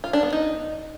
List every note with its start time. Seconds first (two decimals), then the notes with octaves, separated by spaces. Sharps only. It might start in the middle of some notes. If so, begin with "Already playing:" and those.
0.04 F4
0.13 D4
0.23 B3
0.33 D#4